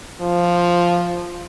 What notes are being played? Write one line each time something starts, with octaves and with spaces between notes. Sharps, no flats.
F3